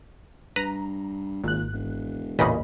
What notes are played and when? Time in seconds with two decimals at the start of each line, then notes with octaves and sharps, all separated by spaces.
0.56 G2 B4 A#5
1.44 G#1 A#2 F#6
1.73 E1
2.39 A1 E2 A#2 C#3 D#5 B5